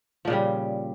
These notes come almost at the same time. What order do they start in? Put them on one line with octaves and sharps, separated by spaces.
F3 A#2 C#3 G3